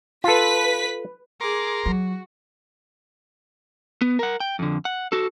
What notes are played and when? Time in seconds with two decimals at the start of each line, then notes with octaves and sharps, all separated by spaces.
0.24 F4 A4 B4 B6
1.41 G#4 A#4 A#5 C6 D6
1.86 F#3 F#4
4.01 B3
4.19 A#4 F#5
4.40 G5
4.59 F2 D3
4.85 F#5
5.12 F#4 A4